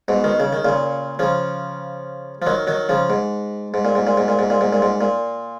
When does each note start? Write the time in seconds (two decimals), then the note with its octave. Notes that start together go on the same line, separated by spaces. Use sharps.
0.08 G#2 B2
0.24 B2 D#3
0.40 C#3
0.53 D#3
0.65 A#2 C#3
1.19 C#3 F3
2.42 F3
2.46 D#3 F#3
2.67 D#3 F#3
2.89 C#3 F3
3.10 G#2
3.74 G#2
3.85 A#2
3.95 G#2
4.07 A#2
4.17 G#2
4.28 A#2
4.39 G#2
4.50 A#2
4.61 G#2
4.73 A#2
4.82 G#2
5.01 A#2